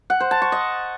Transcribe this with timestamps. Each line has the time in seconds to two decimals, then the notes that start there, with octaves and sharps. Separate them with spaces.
0.10 F#5
0.20 C5
0.31 A5
0.42 C#6
0.52 D#5